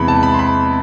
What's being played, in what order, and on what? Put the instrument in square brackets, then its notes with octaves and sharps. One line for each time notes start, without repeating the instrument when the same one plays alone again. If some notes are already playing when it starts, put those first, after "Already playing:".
Already playing: [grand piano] E2 C3 E3 G#3 B5
A5
B5
C6
B5